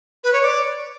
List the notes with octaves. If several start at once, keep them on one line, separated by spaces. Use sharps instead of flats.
B4
C#5
D5